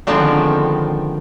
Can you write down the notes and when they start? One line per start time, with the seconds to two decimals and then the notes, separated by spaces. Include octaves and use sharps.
0.07 D3 D#3 F3 G#3 B3 C4